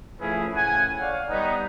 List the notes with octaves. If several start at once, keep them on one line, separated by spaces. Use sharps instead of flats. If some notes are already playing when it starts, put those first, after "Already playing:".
F3 A3 C#4 E4 G#4 B4
A2 C#3 F#5 G#5
C#5 D5 F5 F#5
G3 B3 D#4